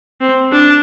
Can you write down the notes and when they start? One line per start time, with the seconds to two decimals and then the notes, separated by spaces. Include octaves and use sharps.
0.21 C4
0.52 D4